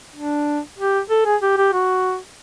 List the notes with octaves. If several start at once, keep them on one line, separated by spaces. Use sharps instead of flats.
D4
G4
A4
G#4
G4
G4
F#4